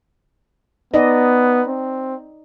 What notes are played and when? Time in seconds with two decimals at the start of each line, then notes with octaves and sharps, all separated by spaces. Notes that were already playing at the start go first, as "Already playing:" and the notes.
0.94 B3 D#4 D5 D#5
1.68 C4